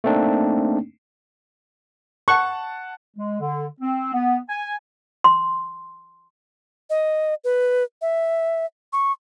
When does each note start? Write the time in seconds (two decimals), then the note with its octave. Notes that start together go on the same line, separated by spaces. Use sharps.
0.04 A3 A#3 C4 D4 D#4
2.28 F#5 A5 C#6 F#6
3.17 G#3
3.40 D3
3.80 C4
4.13 B3
4.48 G#5
5.24 C6
6.90 D#5
7.44 B4
8.02 E5
8.93 C#6